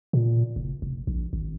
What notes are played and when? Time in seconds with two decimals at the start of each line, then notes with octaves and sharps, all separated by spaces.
0.13 A#2
0.56 F#1
0.82 F1
1.07 A#1
1.33 G#1